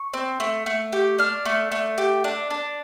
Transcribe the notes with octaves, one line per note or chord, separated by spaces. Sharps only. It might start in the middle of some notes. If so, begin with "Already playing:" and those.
Already playing: C#6
C4
A3
A3
G4
D4 F6
A3
A3
G4
D4
D4